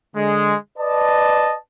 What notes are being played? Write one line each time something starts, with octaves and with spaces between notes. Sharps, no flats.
D3 G#3
B4 D5 D#5 A5